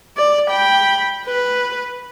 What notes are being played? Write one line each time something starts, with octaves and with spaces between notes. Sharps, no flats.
D5
G5 B5
B4